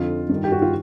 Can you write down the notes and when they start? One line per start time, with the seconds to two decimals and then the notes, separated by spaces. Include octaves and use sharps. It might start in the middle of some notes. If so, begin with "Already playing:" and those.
Already playing: F2 D3 F4
0.29 G2 D#3
0.44 G4
0.52 F#4
0.62 F4